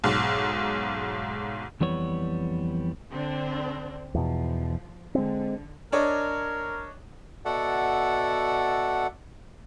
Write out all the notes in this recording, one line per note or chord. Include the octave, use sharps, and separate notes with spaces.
B1 G#2
F2 E3 G3 B3 C#5
D3 C4 D4
E2 B2 F3
D3 G#3 C4
D4 A#4 C#5 D#5
B2 F#4 A4 D5 E5 F#5